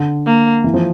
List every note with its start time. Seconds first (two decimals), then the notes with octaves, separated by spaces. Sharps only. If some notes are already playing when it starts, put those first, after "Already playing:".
Already playing: D3
0.26 A#3
0.64 E3
0.74 F3